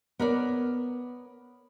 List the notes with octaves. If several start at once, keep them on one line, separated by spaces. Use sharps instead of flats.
B3 A#4 C#5 D5